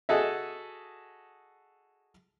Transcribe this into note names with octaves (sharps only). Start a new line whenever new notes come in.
F#4 G#4 A4 D#5 E5